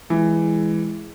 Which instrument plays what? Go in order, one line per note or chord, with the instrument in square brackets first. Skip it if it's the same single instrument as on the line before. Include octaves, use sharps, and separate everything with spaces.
[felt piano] E3 [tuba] G#3